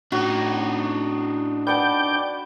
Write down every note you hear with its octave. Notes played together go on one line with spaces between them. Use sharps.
A2 D4 D#4 F#4
B4 D5 F#5 G5 A5 G6